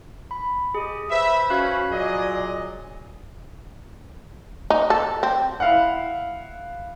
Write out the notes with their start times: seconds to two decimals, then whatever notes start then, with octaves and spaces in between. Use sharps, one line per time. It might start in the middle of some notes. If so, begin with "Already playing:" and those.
0.31 B5
0.74 G4 G#4 D#5
1.10 B4 C5 E5 B5
1.50 C#4 F#4 F5 F#6
1.91 A#2 F#3 G#4 D5 D#5
4.70 D#4
4.90 A4
5.23 C4
5.60 E4 F5 F#5